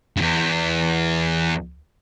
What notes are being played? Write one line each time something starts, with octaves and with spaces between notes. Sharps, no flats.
E2 G2